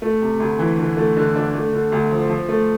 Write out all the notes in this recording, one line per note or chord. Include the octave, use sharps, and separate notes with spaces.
A3
C3
D2
E3
D3
A3
D3
D4
A3
D3
D2
F3
F3
A3